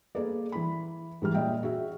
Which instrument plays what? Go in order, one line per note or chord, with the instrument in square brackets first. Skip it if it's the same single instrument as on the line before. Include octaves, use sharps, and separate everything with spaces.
[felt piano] A#3 G#4 A4 B4 D5
E3 B5
G#2 E3 G3 F6
A#2 D#5 E5 G5
F#4 G#4 E5